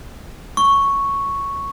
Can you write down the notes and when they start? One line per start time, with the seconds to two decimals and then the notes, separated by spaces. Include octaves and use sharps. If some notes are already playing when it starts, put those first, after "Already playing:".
0.57 C#6